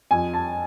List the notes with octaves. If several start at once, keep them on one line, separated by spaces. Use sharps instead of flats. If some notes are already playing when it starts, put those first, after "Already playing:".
F2 G#5
A5